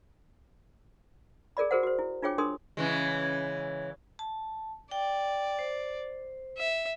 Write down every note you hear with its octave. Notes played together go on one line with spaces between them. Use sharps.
G#4 A#4 D5 B5
F#4 G#4 A#4 C5 F#5
F#4 C5
E4
D4 F4 G#4 C#5 G5 D6
D4 G#4 A#4 C6 D#6
C#3 E3 G#3
A5
D5 G5
C5
E5